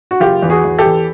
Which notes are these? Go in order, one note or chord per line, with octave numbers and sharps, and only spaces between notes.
F#4
F#1 F4 G4
E2
F#4 G#4
E2
G4 A4
E2